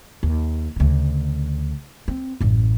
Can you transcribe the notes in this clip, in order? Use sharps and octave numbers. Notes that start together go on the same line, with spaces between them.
D#2
D2 C#3
C4
A1 F#2